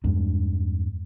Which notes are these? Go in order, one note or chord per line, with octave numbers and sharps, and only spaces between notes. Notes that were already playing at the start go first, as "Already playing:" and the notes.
E2 G2 G#3 D4